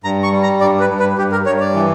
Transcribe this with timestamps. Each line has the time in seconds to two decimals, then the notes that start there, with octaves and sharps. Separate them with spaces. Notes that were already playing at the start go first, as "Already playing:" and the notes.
0.04 G2 A#5
0.23 C#6
0.32 G3
0.43 A#5
0.60 G2 D5
0.80 B4
0.89 G2
0.99 B4
1.17 G2 G4
1.32 A#4
1.46 G2 C#5
1.60 D5
1.74 E3